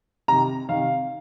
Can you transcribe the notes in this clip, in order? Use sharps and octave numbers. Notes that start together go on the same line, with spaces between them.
C3 D#3 A#5
C3 D#3 F5